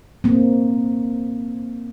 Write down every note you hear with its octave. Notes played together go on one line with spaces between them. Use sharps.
A#3 C4